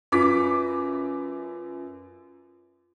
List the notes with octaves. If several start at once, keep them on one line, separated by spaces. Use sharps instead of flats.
F#2 F4 B4 D6 B6